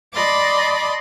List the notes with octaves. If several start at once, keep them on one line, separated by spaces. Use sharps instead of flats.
D5 D#5 A5 B5 C6 D6